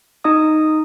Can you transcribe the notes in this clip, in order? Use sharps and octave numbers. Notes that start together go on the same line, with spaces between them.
D#4 D#5 D#6